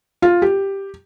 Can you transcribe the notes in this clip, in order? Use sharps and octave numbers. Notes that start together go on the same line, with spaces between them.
F4
G4